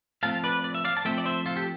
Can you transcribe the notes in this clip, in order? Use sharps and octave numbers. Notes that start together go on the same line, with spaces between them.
F3 A3 C4 F5 A5
B4 D5
D5
E5
D5 F5
A5
F3 A3 C4 E5 G5
D5
C5 E5
F4 A4
G4